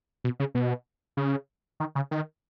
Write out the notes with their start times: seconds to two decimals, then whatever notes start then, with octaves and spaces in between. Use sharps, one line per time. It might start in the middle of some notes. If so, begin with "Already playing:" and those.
0.24 B2
0.40 C#3
0.55 B2
1.17 C#3
1.80 D#3
1.95 C#3
2.11 D#3